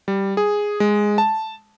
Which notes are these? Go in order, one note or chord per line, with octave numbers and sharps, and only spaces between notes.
G3
G#4
G#3
A5